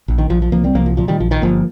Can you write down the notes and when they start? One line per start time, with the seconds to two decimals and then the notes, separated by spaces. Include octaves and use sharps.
0.08 A#1
0.18 D#3
0.30 A#1 F3
0.42 F3
0.52 C2 F3 A#3
0.64 G3 C4
0.75 C2 F3 A#3
0.86 F3
0.97 A#2 F3
1.08 D#3 G3
1.20 A#1 F3
1.31 D#3
1.42 G1 F3 A#3